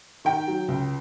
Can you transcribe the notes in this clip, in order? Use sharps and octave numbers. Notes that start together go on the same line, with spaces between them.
D#3 G5
F#3
C#2